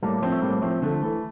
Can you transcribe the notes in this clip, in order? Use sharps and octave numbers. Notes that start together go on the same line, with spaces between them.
A2 G3 A#3
F3 A3 C4
A3
A2 G3 A#3
F3 A3 C4
D3 F3 A3
E3 A3